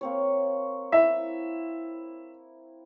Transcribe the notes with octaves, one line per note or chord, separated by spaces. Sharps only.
A#3 C4 C#5
E4 E5 E6